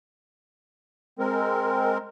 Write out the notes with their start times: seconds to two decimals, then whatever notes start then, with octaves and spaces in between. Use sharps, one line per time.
1.19 G#3 C4 A#4